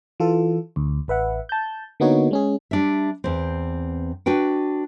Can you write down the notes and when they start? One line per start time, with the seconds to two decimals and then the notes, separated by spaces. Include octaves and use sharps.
0.20 E3 F4 A4
0.76 D2
1.08 A1 B4 E5 F#5
1.49 A5 G6
2.00 D3 A#3 B3 D#4 F#4 C#5
2.31 G#3 C#4 G#4
2.71 G3 D4 E5
3.24 E2 C4
4.26 D4 F#4 B4 G5